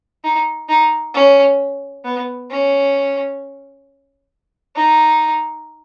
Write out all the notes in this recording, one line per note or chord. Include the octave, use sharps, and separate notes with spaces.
D#4
D#4
C#4
B3
C#4
D#4